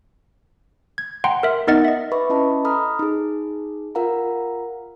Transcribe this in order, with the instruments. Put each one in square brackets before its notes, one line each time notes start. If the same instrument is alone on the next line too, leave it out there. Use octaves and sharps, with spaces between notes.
[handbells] G#6
F#5 G5 A#5 C6
A#4 E5
B3 D#4 A#4 D#5 F#5 A6
D#5 E5
[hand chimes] B4 E5 B5 C#6 D6
C#4 E4 D#5 A5 B5
A4 A#5 B5 D#6 F6
D#4 G#4
F4 A#4 F5 F#5 A#5